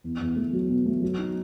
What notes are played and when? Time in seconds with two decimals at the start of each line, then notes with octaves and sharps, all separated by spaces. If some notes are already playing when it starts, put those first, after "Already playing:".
0.04 E2
0.21 E2
0.36 A3
0.53 F#3
0.69 B2
0.86 A3
1.02 F#3
1.18 D#4